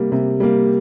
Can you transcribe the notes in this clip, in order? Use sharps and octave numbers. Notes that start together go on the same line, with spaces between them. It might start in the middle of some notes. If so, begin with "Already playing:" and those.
Already playing: C3 G3 A#3
C3
G3 A#3